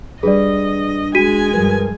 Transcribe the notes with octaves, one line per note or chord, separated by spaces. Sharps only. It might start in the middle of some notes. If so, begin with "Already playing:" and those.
G3 D4 G#4 B4 D5 D#5
G#3 F#4 G#5 B6 D#7
G2 F3 A#4 B4